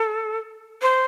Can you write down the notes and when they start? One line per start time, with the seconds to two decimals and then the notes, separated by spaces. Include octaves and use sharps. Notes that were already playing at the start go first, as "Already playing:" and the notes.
Already playing: A4
0.82 C5